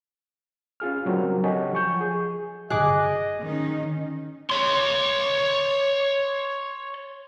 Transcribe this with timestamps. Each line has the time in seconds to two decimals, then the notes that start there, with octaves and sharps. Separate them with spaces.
0.80 C#4 F4 G#4 F6
1.06 C#3 F#3 G3 C4 D4 A#4
1.44 G4 A4 C#5 D#5 F#5 G#5
1.73 F3 C#6 G6
2.01 G#4
2.70 G1 G#4 D#5 D6 F#6
3.40 D#3 C#4 D#4
4.50 C#5 C6